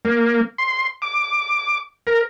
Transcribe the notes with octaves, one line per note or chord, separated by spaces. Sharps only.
A#3
C6
D6
A#4